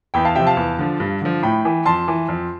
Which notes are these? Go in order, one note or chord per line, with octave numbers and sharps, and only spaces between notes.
E2 G5 B5
F5 A5
C3 F3 E5 G5
F5 A5
E2
D3 F3
G2
D3 F3
A2 G5 B5
E3
F2 A5 C6
E3
F2